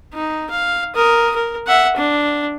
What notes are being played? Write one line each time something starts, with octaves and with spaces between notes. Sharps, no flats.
D#4
F5
A#4 D#6
A#4
E5 F#5
D4